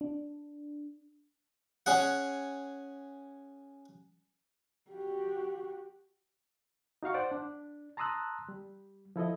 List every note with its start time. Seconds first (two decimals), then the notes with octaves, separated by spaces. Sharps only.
0.01 D4
1.86 C#4 G#4 F#5
4.91 F#4 G4
7.03 D#4 F#4 F5 C#6
7.14 C5 D5 F#5 D6
7.32 D4
7.97 A5 A#5 C6 D#6 E6 F#6
8.49 G3
9.16 F3 E4 A4 D#5